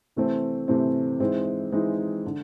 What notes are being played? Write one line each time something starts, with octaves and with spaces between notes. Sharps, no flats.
C3 E3 A3 C4
C3 E3 A3 C4
E3 G#3 C4 D#4
E3 G#3 C4 D#4
D3